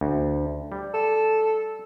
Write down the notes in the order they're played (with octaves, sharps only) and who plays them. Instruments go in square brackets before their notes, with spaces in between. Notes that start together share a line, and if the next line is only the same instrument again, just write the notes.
[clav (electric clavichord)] D2
G3
[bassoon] A4